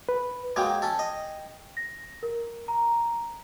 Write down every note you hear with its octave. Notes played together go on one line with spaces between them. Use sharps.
B4
F#3 G#3 A#3 G5 G#6
C#4 A4
D#5
A#6
A#4
A#5